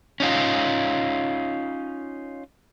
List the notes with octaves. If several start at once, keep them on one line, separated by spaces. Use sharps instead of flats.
C#4 D#4 F4